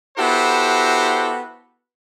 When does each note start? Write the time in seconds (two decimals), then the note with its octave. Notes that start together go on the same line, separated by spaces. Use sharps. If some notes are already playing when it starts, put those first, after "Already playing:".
0.18 B3 E4 F#4 G4 A4 C5